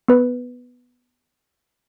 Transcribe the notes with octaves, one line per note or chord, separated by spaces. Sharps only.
B3 B4